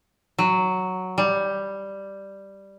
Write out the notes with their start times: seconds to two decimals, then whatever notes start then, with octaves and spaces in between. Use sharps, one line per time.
0.38 F#3
1.18 G3